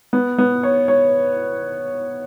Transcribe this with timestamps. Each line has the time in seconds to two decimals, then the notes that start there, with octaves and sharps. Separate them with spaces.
0.13 B3
0.38 B3
0.63 C#5
0.88 C#5